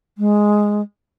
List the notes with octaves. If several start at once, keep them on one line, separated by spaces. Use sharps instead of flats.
G#3